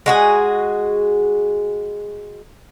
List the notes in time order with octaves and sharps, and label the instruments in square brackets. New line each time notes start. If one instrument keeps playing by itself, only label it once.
[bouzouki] G#3 F#4 G#4